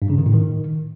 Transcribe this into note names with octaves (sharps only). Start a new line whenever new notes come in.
G2
C#3
D#3
A2
D#3